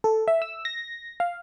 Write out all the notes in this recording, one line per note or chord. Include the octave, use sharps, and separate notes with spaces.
A4
E5
E6
A#6
F5